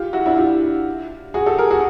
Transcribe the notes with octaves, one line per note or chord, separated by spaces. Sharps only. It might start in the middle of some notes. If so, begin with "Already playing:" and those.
Already playing: F4 G4
E4 F#4
D4 E4
F4 G4
F#4 G#4
G4 A4
G#4 A#4
F#4 G#4